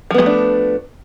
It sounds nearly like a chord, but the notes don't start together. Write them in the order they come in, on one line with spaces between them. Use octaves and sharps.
F3 B3 G#3 A3 D4